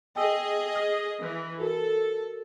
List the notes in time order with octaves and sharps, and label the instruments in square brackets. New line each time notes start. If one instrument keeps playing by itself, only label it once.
[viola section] G#4 D#5 [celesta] G5 G#5 E6
[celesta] F6 A#6
[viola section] E3
[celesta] F#4 A#4 [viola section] A4